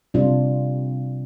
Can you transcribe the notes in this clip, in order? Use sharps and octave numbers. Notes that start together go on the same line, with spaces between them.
C3 G3 D4 F4